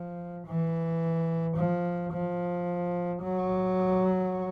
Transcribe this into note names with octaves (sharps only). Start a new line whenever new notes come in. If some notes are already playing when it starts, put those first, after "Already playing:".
Already playing: F3
E3
F3
F3
F#3